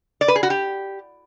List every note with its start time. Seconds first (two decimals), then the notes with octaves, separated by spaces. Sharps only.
0.21 D5
0.28 B4
0.36 G#4
0.43 F#4
0.50 G4